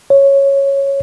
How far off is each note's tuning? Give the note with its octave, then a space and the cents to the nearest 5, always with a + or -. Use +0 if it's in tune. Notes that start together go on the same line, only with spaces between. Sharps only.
C#5 -5